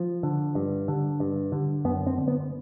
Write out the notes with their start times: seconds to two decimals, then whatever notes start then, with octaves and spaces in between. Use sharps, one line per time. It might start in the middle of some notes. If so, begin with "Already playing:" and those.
Already playing: F3
0.23 D3
0.55 G2
0.88 D3
1.20 G2
1.52 D3
1.85 F#2 B3
2.07 C4
2.18 D3
2.28 B3